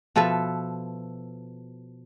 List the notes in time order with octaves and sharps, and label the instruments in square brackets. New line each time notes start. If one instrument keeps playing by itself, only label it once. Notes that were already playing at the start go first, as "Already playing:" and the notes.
[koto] B2 F3 A4 B4 E5